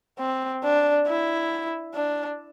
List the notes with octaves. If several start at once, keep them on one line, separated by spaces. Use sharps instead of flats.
C4
D4
E4
D4